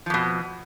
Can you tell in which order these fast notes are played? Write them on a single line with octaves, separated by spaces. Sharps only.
F3 F2 B2